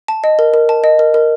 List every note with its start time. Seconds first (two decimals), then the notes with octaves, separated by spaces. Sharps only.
0.08 A5
0.24 D#5
0.39 A#4
0.54 A#4
0.69 A5
0.84 D#5
0.99 A#4
1.14 A#4